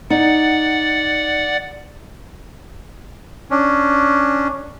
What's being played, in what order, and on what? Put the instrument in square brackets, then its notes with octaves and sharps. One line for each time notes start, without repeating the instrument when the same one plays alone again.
[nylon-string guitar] D#4 [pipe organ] D5 F#5
[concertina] C#4 D4